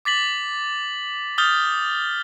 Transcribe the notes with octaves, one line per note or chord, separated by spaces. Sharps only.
D6 A6 B6 F#7
D#6 F6 G6 A6 G7